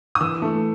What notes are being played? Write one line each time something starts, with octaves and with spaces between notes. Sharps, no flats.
D#6
E3 E6
A3